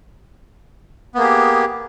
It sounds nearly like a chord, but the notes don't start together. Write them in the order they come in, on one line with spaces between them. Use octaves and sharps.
B3 A#3 G#4 G4